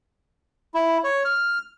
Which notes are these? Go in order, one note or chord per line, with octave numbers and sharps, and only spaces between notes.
E4
C#5
F6